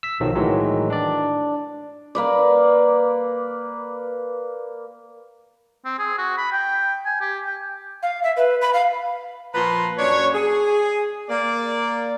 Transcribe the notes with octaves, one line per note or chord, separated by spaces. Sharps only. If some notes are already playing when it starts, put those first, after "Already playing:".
E6 B6
B1 D#3 F3 F#3
A2 D#3 E3 F#3 G#3
D4 D5
A#3 B4 D5
C4
G#4
F#4
B5
G5
G#5
G4
G5
F5
E5
B4
B5
F5
A#2 F3 B4 A5 A#5 C6
F#2 A#3 D4 C#5
G#4
A#3 D5